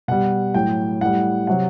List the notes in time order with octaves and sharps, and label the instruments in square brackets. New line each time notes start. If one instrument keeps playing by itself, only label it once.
[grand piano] B2 G3 F#5
A2 F#3 G5
A2 G3 F#5
C3 F#3 F#5